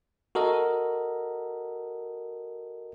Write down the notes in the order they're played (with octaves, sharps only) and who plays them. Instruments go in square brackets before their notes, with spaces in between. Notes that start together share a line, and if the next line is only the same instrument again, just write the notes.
[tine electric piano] F#4 A4 A#4 D#5